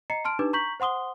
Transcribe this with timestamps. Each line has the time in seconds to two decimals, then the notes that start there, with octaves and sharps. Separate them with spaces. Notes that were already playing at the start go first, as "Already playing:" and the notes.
0.10 D#5 A#5 C7 C#7
0.25 A5 C6 F6 D7
0.39 D4 D#4 G4 B4 D6
0.53 A#5 C#6 G6 B6 F#7
0.80 C5 F#5 C6 D#6 G7